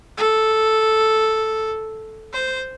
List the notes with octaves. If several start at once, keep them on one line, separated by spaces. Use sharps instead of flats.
A4
C5